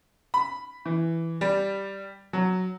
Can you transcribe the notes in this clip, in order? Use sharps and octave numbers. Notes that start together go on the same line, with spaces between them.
B5
E3
G3
F#3